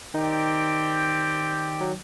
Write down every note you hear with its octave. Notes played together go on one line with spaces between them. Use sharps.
D#3 C4 D#4 G4 D5 G5
F#3